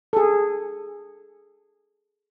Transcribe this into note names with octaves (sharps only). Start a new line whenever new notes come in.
G#4 A4